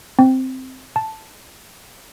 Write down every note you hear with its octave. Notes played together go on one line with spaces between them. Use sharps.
C4
A5